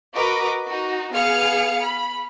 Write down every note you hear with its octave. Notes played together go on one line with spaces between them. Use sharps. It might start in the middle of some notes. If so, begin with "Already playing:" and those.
F#4 A#4 B4 D#5 D6
D#4 F#4
B3 G#4 F5 F6 C#7
B5